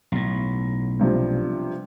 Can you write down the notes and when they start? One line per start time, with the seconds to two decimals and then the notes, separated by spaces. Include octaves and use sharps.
0.12 B1 A2
0.99 G2 C3 F3